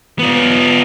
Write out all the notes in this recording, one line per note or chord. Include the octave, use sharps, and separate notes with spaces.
B3 F4